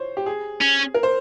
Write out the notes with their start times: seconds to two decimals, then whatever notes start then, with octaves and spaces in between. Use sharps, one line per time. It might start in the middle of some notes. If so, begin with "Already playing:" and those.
Already playing: C5 C#5
0.17 G4
0.26 G#4
0.61 C#4
0.94 A#4
1.03 C5